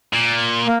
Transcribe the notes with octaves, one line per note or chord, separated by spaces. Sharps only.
A#2
A#3